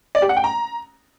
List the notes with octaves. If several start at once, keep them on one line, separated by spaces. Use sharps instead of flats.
D5
G4
F#5
G5
A#5